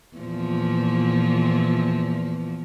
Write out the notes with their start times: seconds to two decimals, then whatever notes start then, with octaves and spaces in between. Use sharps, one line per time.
0.16 E2 A#2 F3